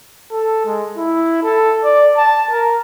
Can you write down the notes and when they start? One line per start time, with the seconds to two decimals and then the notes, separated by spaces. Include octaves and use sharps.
0.32 A4
0.66 G#3
0.98 E4
1.43 A4
1.84 D5
2.17 A5
2.51 A#4